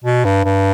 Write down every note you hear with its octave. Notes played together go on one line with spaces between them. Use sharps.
B2
G2
G2